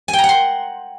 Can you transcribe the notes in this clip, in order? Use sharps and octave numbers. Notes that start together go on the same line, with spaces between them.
G#5
G5
A#5
F#5
C6